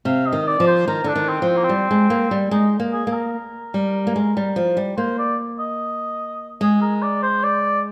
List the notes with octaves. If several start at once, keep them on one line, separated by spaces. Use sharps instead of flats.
C3 F5
D#5
D#3
D5
F3
C5
D#3 A#4
D3 D4
D#3
C4
F3
C4
A#3
C4
G3
G#3
A#3
G3
G#3 D#4
A#3
G#4
A#3
A#4
G3
A#3
G#3
G3
F3
G3
A#3 C5
D5
D#5
G#3 G#4
A#4
D5
C5
D5